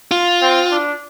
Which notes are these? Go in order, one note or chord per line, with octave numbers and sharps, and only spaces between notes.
F4
C4
D4